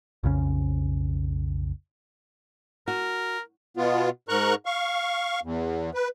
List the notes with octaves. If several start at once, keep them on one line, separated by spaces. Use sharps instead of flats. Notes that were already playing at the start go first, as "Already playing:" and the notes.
B1 F2 C#3 C#4
F#4 A#4
B2 B3 F4
G#2 A#4 A#5 C#6 F#6
F5 C#6
E2
B4